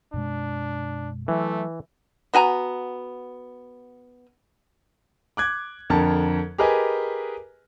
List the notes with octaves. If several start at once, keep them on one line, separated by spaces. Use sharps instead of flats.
F#2 B2 G#3 D4
E3 F#3 A3
B3 F#4 G#5 A#5
D6 F#6 G#6
F2 D3 A#4 A5
G4 G#4 A#4 B4 D#5 G#5